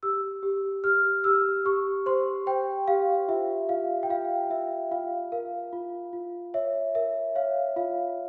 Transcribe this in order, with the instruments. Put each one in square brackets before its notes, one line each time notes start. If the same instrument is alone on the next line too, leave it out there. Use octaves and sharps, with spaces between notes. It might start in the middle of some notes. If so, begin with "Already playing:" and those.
[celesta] G4 E6
G4
G4 F6
G4 E6
G4 C#6
C5 C6
C5 G5
G4 F5
F4 E5
F4 F5
G5
F4 F5
F4 E5
F4 F5
A#4 F5
F4
F4
C#5 E5
A#4 E5
C#5 F5
F4 F5